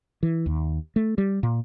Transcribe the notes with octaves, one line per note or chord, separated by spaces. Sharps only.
E3
D#2
A3
G3
A#2